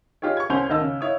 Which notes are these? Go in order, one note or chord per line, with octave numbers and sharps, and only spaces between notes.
D#4 F4 G4 G#4 C#5
C#6 G#6
C2 C#4 C5 G#5 G6 F7
D2 D#3 D#5 A5 E6 G6
C#3
D#4 E4 C#5 F5 D#6